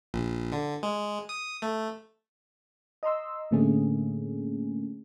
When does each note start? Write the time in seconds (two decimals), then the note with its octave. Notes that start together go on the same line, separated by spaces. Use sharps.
0.14 A#1
0.52 D3
0.83 G#3
1.29 D#6
1.62 A3
3.03 D#5 A#5 C6 E6
3.51 A2 D3 A3 A#3 C#4 G#4